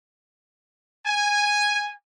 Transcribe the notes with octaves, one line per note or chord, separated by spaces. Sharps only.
G#5